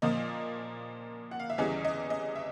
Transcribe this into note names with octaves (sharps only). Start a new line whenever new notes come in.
A#2 F3 A#3 D#5
F#5
F5
E5
E2 C#3 E3 G3 D#5
D#5
D#5
E5